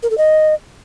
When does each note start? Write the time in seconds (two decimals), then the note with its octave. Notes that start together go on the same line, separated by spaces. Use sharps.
0.03 A#4
0.10 A4
0.18 D#5